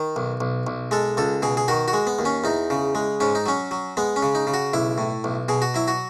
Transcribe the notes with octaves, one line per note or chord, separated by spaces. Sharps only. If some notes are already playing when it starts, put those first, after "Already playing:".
Already playing: D#3
B1
B1
B1
G#3 A4
C#2 A4
B2 G#4
G#4
D#3 F#4
F#4
G#3
B3
D#2
C#4
E2 D#4
C#3
G#3
G#2 C#4
D#4
F#3 C#4
F#3
G#3 B3
C#4
C#3
D#4
C#3
F#4
B1 E4
A2
B1
B2 G#4
F#4
F#3 E4
F#4